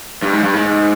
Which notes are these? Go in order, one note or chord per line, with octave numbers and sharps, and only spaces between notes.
G2
G#2
G2
G#2